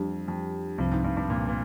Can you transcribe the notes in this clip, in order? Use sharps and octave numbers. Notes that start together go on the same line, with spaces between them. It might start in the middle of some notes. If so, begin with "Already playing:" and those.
Already playing: F2 G3 D4 G4
F2
C2 G2 C3 F3 C4
G#2
G2
G2
A#2
A#2